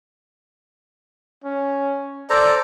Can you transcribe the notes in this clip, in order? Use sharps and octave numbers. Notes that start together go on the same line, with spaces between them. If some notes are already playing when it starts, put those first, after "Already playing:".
C#4
A4 C5 D5 A#5